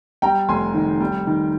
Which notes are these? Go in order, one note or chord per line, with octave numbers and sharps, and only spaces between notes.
G3 G5 A#5
F1 G#5 C6
D#3
G3
D#3